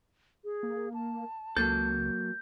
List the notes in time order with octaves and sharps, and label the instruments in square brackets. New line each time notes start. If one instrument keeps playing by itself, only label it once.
[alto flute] G#4
[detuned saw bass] A#3
[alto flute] A5
[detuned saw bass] C#2 [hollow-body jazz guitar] F#3 A#3 A4 [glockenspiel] G6